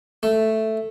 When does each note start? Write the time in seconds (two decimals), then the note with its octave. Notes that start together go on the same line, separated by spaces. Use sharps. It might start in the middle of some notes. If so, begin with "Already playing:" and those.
0.23 A3